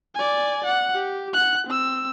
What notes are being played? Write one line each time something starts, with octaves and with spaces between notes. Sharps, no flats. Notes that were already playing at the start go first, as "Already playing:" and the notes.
D5 G#5
F#5
G4
F#5 F#6
C4 E6